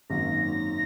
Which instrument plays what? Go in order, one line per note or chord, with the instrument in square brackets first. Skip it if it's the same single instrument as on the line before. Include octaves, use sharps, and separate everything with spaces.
[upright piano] G#1 F#2 D#3 F#3 A#3 [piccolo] A#6